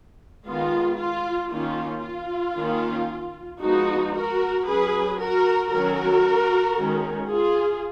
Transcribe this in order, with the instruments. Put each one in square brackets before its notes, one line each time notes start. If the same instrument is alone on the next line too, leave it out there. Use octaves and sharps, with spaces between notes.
[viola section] D#3 G#3 B3 F4
F4
D#3 A#3 C#4 F4
F4
D#3 A#3 C#4
F3 G#3 B3 D#4 F#4
F#4 A#4
F#3 C#4 G#4 B4
F#4 A#4
D#3 F#3 C#4 F#4 A#4
D#3 G#3 C#4
F4 G#4